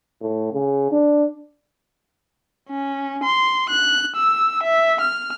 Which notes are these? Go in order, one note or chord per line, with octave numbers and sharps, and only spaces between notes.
A2
C#3
D4
C#4
C6
F#6
E6
E5
F6